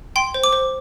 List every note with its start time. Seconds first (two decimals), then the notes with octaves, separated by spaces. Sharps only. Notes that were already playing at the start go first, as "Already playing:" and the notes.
0.16 G5 C6
0.34 C5
0.44 D6
0.53 C5